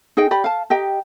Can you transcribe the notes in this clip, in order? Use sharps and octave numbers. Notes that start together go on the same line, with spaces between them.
D#4 G#4 D#5 G5
G4 D5 B5
F5 A5
G4 D#5 G5 A#5